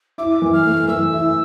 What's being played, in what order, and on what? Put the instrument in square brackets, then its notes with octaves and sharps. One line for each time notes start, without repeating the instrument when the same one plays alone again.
[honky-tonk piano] E4 [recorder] D6
[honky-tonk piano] E3
[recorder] F6
[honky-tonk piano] A3
[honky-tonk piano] E3 [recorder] E6
[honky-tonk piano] E4